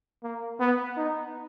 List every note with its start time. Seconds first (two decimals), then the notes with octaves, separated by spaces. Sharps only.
0.23 A#3
0.60 B3
0.97 D#4